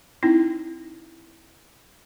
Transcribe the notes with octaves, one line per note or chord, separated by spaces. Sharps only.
C4 D#4 E4